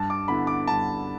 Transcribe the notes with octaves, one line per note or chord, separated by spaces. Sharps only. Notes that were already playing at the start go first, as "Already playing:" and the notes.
Already playing: G2 A5
D6
D3 B3 E4 B5
D6
G2 A5